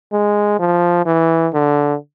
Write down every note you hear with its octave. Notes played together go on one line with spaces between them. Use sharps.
G#3
F3
E3
D3